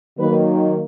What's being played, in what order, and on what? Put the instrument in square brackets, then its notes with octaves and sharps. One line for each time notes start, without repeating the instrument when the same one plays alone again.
[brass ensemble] D#3 F#3 A#3 B4